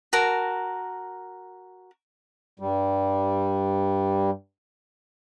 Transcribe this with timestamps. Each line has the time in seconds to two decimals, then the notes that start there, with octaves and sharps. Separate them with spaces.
0.13 F#4 A#4 A5
2.60 G2 G3